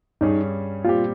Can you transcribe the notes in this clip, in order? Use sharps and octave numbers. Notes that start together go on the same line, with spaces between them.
G2 G3 C#4 D#4 G#4
A#2 G3 C4 F4 G4